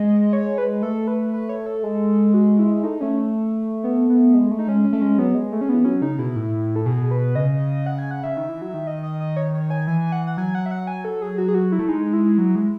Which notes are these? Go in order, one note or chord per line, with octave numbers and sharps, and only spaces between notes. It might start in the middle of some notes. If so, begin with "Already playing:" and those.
Already playing: G#3 D#5
C#5
B4
A3 A4
B4
B4
C#5
A4
G#3
F#4
E4
E4
A3 D#4
A3 C#4
B3
B3
G#3
A3
D#4
G#3 C#4
C#4
A3
G#3 C#4
F#3 B3
G#3
A3
C#4
B3
E3
F#3 C#4
C#3 D#4
B2 E4
A2
A4
B2 G#4
B4
C#3 D#5
F#5
G#5
F#5
C#3 E5
D#3
E3
F#3
D#3
D#5
D#5
D#5
C#5
C#5
G#5
E3 G#5
F#5
F#5
F#3 G#5
F#5
E5
F#5
G#5
A4
G#4
F#4
G#4
F#4
E4
A3
G#3 D#4
E4
F#3
G#3